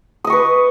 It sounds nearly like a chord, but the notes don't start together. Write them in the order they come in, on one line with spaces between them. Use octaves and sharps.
D#6 D#5 C#6 B4